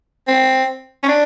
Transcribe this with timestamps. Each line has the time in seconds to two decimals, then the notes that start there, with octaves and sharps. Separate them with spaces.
0.28 C4
1.03 C#4
1.08 D4